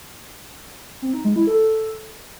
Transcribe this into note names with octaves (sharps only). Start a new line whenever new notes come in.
C4
D#4
G#3
E4
A4